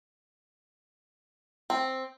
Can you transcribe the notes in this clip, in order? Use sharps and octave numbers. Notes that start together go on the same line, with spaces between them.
C4